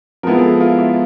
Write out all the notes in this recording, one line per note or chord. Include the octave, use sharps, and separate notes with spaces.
F3 G#3 B3 E4 A#4
G#4
A4
F4
E4